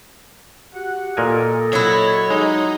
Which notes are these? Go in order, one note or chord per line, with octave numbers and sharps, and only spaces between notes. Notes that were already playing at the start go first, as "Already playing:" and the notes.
F#4 G4 F#5
A#2 A4 A#4 D#5 G#5
F#3 E4 C#5
G#3 D#4